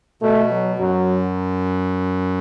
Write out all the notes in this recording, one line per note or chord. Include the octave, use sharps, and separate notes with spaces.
B2 A3
F#3
F#2 F#3